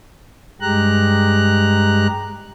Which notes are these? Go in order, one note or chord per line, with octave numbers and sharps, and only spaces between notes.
G2 G#3 G4 A#5 F#6